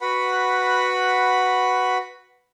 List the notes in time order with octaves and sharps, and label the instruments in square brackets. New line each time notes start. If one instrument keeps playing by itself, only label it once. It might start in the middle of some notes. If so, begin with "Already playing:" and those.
[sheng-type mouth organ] F#4 B4 F#5 B5